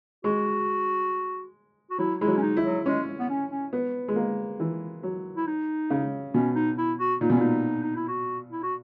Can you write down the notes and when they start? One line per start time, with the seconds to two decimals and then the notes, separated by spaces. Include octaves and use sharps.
0.24 G#3 F#4
1.90 F#4
1.98 F#3 E4
2.21 G#3 E4
2.27 F#3
2.37 C#4
2.42 D#4
2.57 E4
2.64 F#3
2.86 G#3 C#4
3.19 B3
3.29 C#4
3.51 C#4
3.73 B3
4.08 G#3
4.16 A#3
4.60 E3
5.03 F#3
5.36 E4
5.47 D#4
5.90 C#3
6.34 B2 C#4
6.55 D#4
6.78 E4
6.99 F#4
7.21 A#2 D#4
7.30 B2 C#4
7.37 A#2 D#4
7.83 D#4
7.95 E4
8.08 F#4
8.52 E4
8.63 F#4